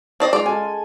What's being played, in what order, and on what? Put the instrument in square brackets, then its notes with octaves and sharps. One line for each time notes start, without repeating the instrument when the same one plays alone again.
[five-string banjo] C4 D5 D#5
[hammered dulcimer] G#3 [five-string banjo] F4 D5
[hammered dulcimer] A4 G#5